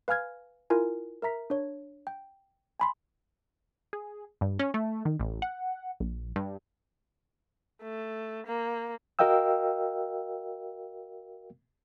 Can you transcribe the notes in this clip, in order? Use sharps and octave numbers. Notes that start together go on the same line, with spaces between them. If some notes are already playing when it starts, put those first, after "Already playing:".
B4 F5 G#5 F6 G#6
E4 F4 A#4 G#5
A#4 E5 A#5 B6
D4 C#5
G5
G#5 B5 C6
G#4
G2
C#4
A3
D#3
A1
F#5
A#1
G2
A3
A#3
F#4 A#4 D#5 F5 G5 E6